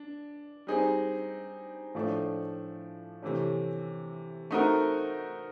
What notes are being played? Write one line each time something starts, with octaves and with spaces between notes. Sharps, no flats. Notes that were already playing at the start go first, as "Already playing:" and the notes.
Already playing: D4
G3 C4 D#4 G#4
A2 F3 A3 D4
C3 E3 A3 C#4
A3 C4 D#4 F#4 A#4